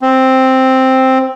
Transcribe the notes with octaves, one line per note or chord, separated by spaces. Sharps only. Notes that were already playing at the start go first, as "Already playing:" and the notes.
C4